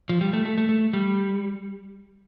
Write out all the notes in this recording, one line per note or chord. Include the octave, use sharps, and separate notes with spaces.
F3
G3
A3
A3
A3
A3
G3